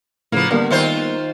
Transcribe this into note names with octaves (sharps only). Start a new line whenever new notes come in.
A2 C#3 F3 A#3 B3
D3 G3 A#3 B3
D#3 F4 C5